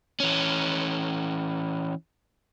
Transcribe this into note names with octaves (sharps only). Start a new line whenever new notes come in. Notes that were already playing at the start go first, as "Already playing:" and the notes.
E3 C#4